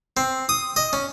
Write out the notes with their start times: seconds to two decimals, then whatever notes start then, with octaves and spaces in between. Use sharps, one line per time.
0.17 C4
0.49 D#6
0.76 D#5
0.93 C#4